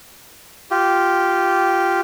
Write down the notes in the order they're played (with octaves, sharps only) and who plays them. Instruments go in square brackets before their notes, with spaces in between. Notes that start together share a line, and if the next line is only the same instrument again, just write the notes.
[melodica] F4 G4